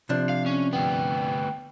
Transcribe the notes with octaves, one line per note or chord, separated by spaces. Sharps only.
C3 F3 D4
F5
C#4
D2 B3 G5